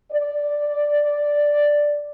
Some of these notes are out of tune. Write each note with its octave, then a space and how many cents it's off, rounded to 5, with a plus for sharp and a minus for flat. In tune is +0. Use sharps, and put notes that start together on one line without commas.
D5 +0